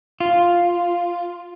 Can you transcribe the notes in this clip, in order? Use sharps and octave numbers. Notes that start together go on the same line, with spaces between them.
F4